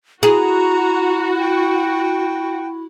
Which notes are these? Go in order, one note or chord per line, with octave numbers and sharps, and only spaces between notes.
E4 F#4 G#4 A#5
G5